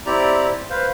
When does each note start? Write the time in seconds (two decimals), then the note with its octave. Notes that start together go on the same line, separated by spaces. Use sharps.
0.06 C4 E4 G4 D5 A#5
0.70 B4 C5 F5